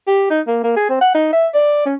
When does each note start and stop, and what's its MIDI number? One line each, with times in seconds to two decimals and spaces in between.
0.07 0.27 67
0.30 0.41 63
0.47 0.60 58
0.63 0.75 58
0.76 0.88 68
0.90 1.01 60
1.01 1.13 78
1.15 1.33 63
1.33 1.47 76
1.54 1.84 74
1.86 1.95 61